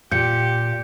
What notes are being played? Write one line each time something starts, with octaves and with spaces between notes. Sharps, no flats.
A#2 G4 G6 C#7